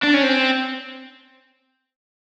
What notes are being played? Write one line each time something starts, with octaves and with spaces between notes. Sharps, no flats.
D4
C#4
C4